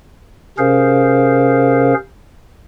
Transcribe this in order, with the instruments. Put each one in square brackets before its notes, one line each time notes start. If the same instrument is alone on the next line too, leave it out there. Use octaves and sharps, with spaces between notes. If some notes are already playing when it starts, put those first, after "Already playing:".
[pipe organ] C3 C#4 G#4 A#4 C5 F5